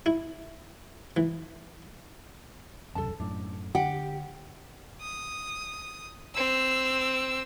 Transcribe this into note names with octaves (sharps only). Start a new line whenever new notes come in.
E4
E3
E1 C2 F#2 A4 A5
F#2 A2 D4
D3 G4 F#5
D#6
C4 E6